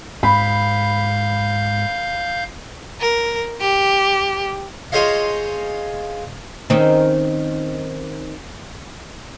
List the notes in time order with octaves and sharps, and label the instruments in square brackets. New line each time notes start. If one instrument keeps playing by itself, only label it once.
[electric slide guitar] G#2 [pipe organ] F5 G6 [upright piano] B5
[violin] A#4
G4
[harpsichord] F4 G#4 C5 C#5 D#5 F5
[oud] D#3 C4 C#4